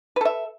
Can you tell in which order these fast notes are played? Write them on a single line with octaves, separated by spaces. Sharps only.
B4 A4 E5